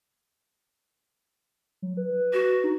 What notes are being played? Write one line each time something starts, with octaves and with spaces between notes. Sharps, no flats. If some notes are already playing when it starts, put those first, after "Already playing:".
F#3
B4
F#4
D#4